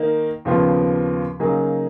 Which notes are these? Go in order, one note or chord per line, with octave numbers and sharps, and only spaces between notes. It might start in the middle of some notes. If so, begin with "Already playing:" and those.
Already playing: D#3 A#3 D#4
D#2 C#3 F3 B3 F4
C#3 F#3 A#3 D#4 G#4